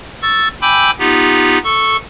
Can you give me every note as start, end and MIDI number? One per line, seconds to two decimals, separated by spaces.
0.22 0.48 85
0.22 0.48 88
0.22 0.48 93
0.62 0.91 79
0.62 0.91 80
0.62 0.91 83
0.62 0.91 86
0.62 0.91 88
0.62 0.91 91
0.99 1.58 59
0.99 1.58 63
0.99 1.58 65
0.99 1.58 67
1.64 1.97 69
1.64 1.97 85